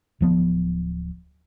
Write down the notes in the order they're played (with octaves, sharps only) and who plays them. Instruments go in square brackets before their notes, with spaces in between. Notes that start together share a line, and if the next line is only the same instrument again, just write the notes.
[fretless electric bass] D1 F3 B3